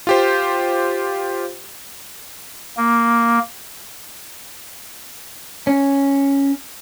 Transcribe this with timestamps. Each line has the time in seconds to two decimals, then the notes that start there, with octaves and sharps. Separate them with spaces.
0.07 F4 G4 C5
2.77 A#3
5.67 C#4